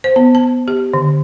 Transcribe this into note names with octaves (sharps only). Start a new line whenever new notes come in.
C5
B3
A5
G4
D3